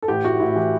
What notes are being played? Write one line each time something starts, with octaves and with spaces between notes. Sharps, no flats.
A4
A1 G4
A2 F#4
A1 E4
E3 G4